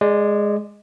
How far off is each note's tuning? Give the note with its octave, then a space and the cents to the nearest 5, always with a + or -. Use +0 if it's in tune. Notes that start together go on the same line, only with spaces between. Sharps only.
G#3 +0 D5 +20